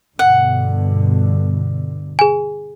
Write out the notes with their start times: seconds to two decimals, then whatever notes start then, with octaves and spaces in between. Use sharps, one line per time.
0.19 G2 B2 D3 F#5
2.19 G#4 G#5